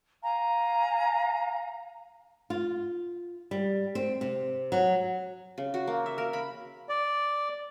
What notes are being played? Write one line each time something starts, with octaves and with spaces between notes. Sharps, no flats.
F5 G#5 A#5
F4
G3
C4
C3
F#3
C#3
F#4
A#3
E5
A#4
B5
D5